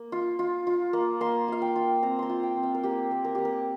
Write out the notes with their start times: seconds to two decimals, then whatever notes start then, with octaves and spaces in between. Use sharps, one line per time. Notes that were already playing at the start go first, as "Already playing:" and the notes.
Already playing: A#3
0.12 F4
0.39 F4
0.67 F4
0.93 A#3
1.21 A#3 C6
1.48 F4 F5
1.62 G5
1.76 F4
2.03 C4 A#5
2.19 A#5 C6
2.29 F4
2.43 G5
2.57 C4
2.63 F5
2.75 A#4
2.83 A#3 G4
3.11 A#3
3.25 A#4
3.35 A#3 G4
3.45 A#4